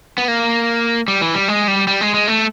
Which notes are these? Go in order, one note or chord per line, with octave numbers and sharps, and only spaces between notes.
B3
A#3
G3
E3
G3
G#3
G3
G3
G#3
G#3
A3